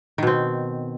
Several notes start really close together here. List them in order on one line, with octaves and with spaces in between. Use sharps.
D#3 B2 C4